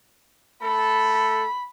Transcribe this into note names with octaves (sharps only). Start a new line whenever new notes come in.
A3 A4 B5